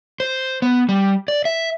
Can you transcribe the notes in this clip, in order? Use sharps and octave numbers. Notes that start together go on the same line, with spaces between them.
C5
B3
G3
D5
E5